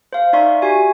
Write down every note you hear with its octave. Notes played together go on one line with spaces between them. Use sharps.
C5 F5
D#4 D5 E5 C6 C#6
F#4 G4 G#5